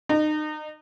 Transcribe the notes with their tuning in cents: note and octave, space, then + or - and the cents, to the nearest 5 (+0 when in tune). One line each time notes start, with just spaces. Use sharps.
D#4 -30